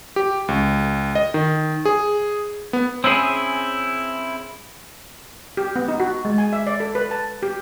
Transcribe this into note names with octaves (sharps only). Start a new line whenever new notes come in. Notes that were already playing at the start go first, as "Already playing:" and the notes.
G4
C#2
D#5
D#3
G#4
B3
C4 C#4 E4 G#4
G4
B3
D#4
F#4
G#3
G#5
E5
D5
A4
B4
A5
G4